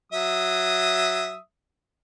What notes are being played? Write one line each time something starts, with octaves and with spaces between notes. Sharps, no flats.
F#3 E5 D#6